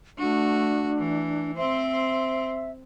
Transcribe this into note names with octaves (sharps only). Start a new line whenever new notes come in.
A3 D4 F#4
E3
C4 C5 E5